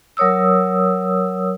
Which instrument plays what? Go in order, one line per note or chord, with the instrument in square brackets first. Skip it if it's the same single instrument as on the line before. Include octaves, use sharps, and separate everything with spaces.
[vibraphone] F#3 A#4 C#5 D#6 E6